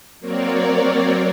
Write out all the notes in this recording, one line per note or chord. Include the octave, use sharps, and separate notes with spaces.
F#3 A#3 C4 A#4 C#5 D5